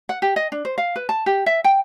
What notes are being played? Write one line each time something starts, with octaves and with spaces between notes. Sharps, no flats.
F#5
G4
D#5
D4
C5
F5
B4
A5
G4
E5
G5